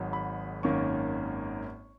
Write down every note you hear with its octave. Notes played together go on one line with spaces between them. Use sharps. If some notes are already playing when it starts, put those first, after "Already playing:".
Already playing: G#1 G#2 F#3
B5
G#1 F#2 D#3 A#3 C#4 C#6